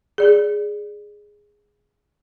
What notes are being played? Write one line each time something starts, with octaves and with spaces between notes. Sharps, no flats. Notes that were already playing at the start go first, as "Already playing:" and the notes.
G#4 D5